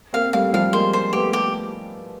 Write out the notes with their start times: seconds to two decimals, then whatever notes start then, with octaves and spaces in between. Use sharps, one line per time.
0.13 A#3 C4 F5
0.33 G3 A3 F5
0.53 F3 G3 F5
0.73 G#3 A#3 C5
0.93 C5
1.13 A3 B3 G4
1.33 G4